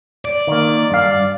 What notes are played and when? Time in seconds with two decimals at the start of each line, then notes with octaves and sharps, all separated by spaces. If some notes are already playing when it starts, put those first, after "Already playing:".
0.25 D5
0.47 D#3 A#3
0.91 G2 F5